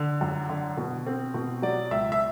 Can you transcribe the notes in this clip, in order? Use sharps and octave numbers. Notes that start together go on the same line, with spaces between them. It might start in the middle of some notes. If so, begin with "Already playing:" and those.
Already playing: D3
F#2
D3
B2
C4
B2
F#3 D5
C#2 E5
E5